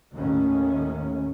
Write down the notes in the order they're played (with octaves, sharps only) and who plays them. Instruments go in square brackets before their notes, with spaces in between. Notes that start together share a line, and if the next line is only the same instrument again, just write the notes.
[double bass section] D#2 A2 D#3 C#4